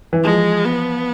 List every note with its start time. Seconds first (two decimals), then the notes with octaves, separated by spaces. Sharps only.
0.13 E3
0.24 F3 G#3
0.65 B3